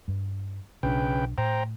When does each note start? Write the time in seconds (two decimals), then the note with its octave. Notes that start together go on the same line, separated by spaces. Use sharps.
0.08 G2
0.83 B1 C#3 D4 B4 G5
1.38 A2 C5 G5 A#5